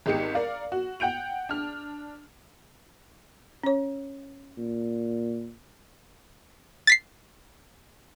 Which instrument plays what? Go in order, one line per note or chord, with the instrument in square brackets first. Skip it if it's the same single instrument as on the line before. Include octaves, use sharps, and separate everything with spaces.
[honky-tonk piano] G#1 D#4 G4 C#7
A#4 D5 F5
F#4
F#5 G5 G6 D7 F7
D4 F6
[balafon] C#4 C#5
[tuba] A#2
[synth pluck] A6 B6 C7